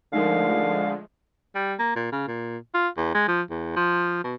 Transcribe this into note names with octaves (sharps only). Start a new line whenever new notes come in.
D3 F3 G#3 A3 D#4 A#4 F5
G3
A#3
A#2
C#3
A#2
F4
E2
G#3
F3
E2
F3
B2